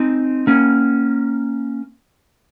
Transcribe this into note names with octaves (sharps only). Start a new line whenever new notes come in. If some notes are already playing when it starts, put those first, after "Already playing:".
Already playing: C4 D#4
A#3 C#4